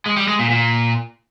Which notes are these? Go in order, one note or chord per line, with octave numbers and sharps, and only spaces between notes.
G#3
G3
G#3
A#2
A#2